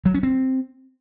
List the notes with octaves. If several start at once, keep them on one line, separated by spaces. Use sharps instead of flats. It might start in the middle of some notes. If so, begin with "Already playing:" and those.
F#3
C#4
C4